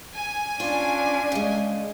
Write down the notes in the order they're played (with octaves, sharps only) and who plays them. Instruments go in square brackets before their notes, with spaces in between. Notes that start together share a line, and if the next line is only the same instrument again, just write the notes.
[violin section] G#5
[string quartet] C#4 D4 [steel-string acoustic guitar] F4
[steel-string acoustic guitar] C#3 G#3